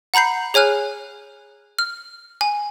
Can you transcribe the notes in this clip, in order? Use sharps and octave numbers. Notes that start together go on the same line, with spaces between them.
F#5 A#5 B5 G6 C7
G#4 C#5 G#5 F6 F#6
F6
G#5